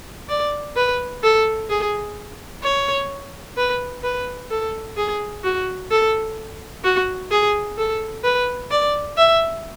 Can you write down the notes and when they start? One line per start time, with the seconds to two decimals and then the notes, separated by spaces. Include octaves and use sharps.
0.29 D5
0.76 B4
1.23 A4
1.70 G#4
2.64 C#5
3.57 B4
4.03 B4
4.50 A4
4.97 G#4
5.44 F#4
5.91 A4
6.84 F#4
7.31 G#4
7.78 A4
8.24 B4
8.71 D5
9.18 E5